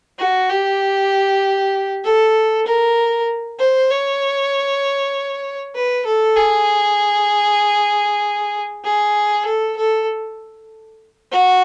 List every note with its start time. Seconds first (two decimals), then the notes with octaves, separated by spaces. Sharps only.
0.19 F#4
0.50 G4
2.04 A4
2.66 A#4
3.59 C5
3.90 C#5
5.74 B4
6.06 A4
6.36 G#4
8.84 G#4
9.45 A4
9.77 A4
11.31 F#4